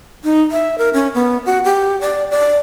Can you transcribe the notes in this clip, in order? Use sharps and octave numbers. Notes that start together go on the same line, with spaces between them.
D#4
E5
A#4
C#4
B3
F#4
G4
D5
D5